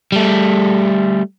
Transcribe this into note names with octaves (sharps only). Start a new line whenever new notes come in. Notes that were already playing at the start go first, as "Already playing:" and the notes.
G3 A3